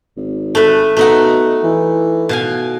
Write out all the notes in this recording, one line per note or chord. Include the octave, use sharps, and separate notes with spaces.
G#1
A3 B4
B2 A3 D#4 F#5
E3
B2 F5 G#5